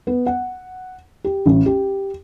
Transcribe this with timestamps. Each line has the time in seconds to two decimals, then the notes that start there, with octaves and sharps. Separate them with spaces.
0.07 B3
0.26 F#5
1.24 G4
1.46 A1
1.66 G4